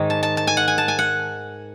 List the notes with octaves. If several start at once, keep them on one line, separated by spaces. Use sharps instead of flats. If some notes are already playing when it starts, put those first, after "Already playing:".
Already playing: G#2 D#3
A5
A5
A5
G#5
F#5
G#5
A5
G#5
F#5